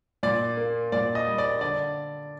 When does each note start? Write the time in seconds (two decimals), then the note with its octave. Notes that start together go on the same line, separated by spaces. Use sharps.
0.23 A#2 D5
0.57 A#3
0.92 A#2 D5
1.15 D#5
1.27 G3
1.38 D5
1.61 D3 D5